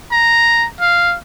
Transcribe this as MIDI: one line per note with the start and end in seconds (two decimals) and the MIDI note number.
0.12 0.66 82
0.80 1.16 77